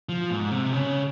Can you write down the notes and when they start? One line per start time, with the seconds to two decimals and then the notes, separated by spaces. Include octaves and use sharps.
0.09 F3
0.30 G#2
0.51 C3
0.73 C#3